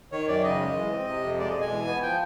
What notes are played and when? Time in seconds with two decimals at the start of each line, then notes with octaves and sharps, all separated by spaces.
0.12 D#3 C#5
0.28 F#2 D5
0.44 C#3 D#5
0.60 G#3
0.76 E3
0.92 C4
1.08 C3
1.23 F2
1.39 G#3 D5
1.50 D#5
1.55 B2
1.61 G#5
1.71 E3
1.86 B3
2.02 F3 G5